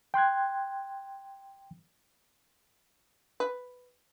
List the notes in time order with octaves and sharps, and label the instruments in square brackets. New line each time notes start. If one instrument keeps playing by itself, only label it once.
[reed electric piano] G5 C6 F#6 G#6
[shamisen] B4